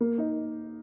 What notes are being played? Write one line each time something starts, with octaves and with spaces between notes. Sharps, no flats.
A#3
D#4